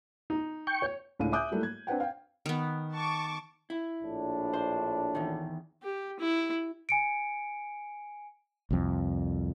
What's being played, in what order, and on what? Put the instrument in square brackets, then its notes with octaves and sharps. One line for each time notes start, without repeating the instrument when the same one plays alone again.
[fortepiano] D#4
[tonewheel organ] G5 C#6
[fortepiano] C#5
[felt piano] C#2 A2 D4 F5 D#7
E5 G#5 D6 D#6 F#6 G6
F#3 G3 A3 A#3 E4
G#6
C4 D4 B4 F#5 G5
F5 G5
[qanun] D#3 B3
[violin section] A5 C#6 D6
[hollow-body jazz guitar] E4
[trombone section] A#1 A2 D4
[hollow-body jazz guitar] C5
E2 D#3
[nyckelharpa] G4
E4
[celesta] G#5 C#7 D7
[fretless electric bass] C2 F2